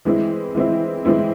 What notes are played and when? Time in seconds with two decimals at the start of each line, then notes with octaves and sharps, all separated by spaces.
0.05 E3 G#3 C4 E4
0.55 E3 G#3 C4 E4
1.05 E3 G#3 C4 E4